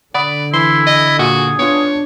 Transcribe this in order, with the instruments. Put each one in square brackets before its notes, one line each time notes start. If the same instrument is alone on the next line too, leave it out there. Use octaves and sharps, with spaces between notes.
[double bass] D3 [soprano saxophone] D5 [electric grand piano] F#5 B5 D#6
[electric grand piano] E3 [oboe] E4 [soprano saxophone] C6
[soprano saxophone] D#5
[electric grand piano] A#2 D#7 [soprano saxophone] F#4 [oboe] G#4
[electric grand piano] B3 F4 [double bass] D4 [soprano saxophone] C#5